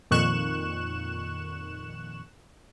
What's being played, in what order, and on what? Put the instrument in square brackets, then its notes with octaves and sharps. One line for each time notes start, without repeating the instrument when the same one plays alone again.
[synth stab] F2 A#2 D#3 C#6 F#6 E7